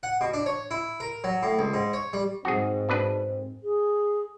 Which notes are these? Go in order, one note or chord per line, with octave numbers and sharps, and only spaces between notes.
F#5
B2
D4
C#5
E4
A#4
F#3
A2
C#2
G#2
C#5
G3
G#2 C4 F#4 G#4
B2 D4 B4
G#4